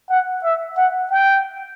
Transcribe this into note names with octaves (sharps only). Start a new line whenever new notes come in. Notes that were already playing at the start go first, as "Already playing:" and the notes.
F#5
E5
F#5
G5